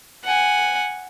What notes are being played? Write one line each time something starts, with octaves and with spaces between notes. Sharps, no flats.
F#5 G#5